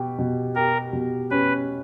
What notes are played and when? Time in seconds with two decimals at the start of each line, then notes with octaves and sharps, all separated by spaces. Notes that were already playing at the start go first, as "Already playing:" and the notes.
Already playing: B2 G4
0.19 B2
0.55 G4 A#4
0.93 B2
1.31 C#4 B4